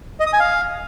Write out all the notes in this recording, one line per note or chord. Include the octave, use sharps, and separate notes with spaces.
D#5
D#6
G#5
F5